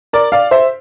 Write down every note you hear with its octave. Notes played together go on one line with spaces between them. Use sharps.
A#4 D5
D5 F5
C5 E5